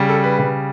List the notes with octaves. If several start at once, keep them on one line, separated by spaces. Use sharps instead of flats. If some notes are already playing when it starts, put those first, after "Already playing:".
Already playing: C#3 G3
A4
B4
C#3 G3